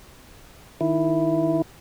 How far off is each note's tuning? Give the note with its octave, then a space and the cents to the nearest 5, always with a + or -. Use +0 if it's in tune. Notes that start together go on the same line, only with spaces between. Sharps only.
D#3 +0 E4 +0